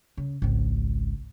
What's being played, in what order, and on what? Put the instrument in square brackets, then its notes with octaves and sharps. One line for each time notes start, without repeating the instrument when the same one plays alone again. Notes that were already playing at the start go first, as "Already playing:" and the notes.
[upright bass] C#3
G#1 C#2